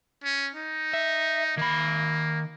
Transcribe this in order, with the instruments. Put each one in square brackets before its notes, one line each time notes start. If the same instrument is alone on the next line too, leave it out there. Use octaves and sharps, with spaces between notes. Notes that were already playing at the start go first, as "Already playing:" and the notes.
[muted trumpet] C#4
D#4
[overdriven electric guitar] E5
[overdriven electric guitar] D#3 B5 [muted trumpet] A#3